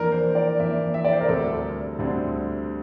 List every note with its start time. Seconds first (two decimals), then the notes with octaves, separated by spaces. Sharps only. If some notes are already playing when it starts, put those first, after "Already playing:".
Already playing: F2 E3 A#3 D4 A#4
0.12 C5
0.35 D5
0.58 F2 E3 A#3 D4 E5
0.94 E5
1.04 D5
1.13 C5
1.21 A#4
1.29 D2 D3 G3 C4 A4
1.99 D2 D3 G3 C4